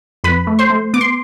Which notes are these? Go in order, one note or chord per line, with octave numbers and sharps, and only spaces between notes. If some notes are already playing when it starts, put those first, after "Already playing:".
F2 B4 B5
A3
C5 C6
A3
B3 D6
C6